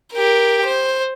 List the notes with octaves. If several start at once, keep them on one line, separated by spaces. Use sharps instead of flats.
G4 A#4
C5